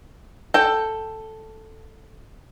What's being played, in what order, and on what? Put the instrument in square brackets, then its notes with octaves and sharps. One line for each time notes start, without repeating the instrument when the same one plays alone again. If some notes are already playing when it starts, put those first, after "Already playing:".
[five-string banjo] A4 G5